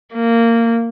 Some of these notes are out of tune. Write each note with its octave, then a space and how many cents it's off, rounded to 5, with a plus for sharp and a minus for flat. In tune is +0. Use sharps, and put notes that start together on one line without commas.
A#3 -15